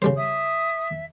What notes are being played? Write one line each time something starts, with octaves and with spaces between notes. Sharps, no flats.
C#3 G3 C5
E5 D#6